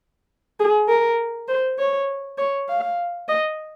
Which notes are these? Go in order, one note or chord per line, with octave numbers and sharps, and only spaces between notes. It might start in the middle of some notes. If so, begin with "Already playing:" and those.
G#4
A#4
C5
C#5
C#5
F5
D#5